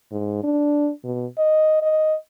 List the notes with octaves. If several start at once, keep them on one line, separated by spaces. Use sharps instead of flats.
G#2
D4
B2
D#5
D#5